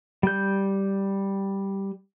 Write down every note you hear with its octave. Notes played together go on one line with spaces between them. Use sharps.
G3 G6